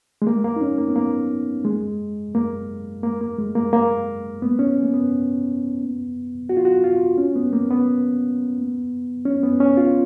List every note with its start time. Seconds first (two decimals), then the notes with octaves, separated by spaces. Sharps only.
0.22 G#3
0.27 A#3
0.44 A#3
0.56 D#4
0.61 C#4
0.78 A#3
0.89 B3
0.96 A#3
1.65 G#3
2.35 A#3
3.03 A#3
3.21 A#3
3.39 G#3
3.55 A#3
3.73 A#3
4.42 B3
4.59 C#4
4.83 A#3
4.93 B3
6.49 F#4
6.57 F4
6.65 F#4
6.84 F4
7.18 C#4
7.36 B3
7.53 A#3
7.70 B3
9.25 C#4
9.43 B3
9.60 C#4
9.77 F4